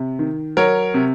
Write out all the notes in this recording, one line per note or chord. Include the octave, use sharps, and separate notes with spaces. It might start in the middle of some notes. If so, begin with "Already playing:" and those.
Already playing: C3
D#3
F#3 A#4 C#5
C3